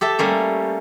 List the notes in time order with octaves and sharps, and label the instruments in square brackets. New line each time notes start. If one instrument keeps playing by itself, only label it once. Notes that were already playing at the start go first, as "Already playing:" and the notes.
[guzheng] G4 A4 E5 A5
G3 A3 A#3 C#4